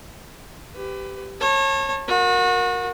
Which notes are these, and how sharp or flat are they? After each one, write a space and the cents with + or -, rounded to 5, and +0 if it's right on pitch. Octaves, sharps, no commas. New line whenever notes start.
G4 +0 B4 +30
C#5 -30 A5 +10
F#4 -35 A#4 +0